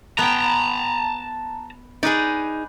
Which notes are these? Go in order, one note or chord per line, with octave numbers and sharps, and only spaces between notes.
B3 G5 A5 A#5
D#4 G#4 B4 D5